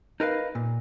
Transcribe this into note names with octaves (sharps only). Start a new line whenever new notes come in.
D#4 A#4 B4 F5
A#2